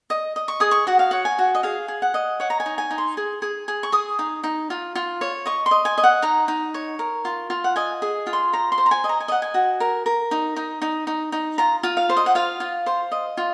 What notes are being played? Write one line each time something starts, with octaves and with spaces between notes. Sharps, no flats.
D#5
D#5
C#6
G#4 D#6
C#6
F#4 F#5
F5
C#5 F#5
G#5
F#4
D#5
G#4 F5
G#4
F#5
D#5
C#5 F#5
A#5
G#5
D#4
G#5
D#4
C6
G#4
G#4
G#4
C#6
G#4 D#6
D#4
D#4
F4
F4
C#5
D#5 C#6
C6
D#5
G#5
D#5
F#5
D#4 A#5
D#4
C#5
A#4
F4
F4
F#5
D#5 G#5
G#4
F4
C6
C5 A#5
C6
C5
A#5
G#5
D#5
A#5
G#5
D#5 F#5
G#5
F#4
A#4
A#4
D#4
D#4
D#4
D#4
D#4
F4 A#5
F4
F5
C5
D#5
F#5
F4 F5
F4
C5
D#5
F4